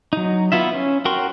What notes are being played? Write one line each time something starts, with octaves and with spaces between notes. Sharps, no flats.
F#3 D#4
B3 E4 F4 E5
C#4
F#4 A#4 G5 C6 C#6